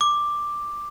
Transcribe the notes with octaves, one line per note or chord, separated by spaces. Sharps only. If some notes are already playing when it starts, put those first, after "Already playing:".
D6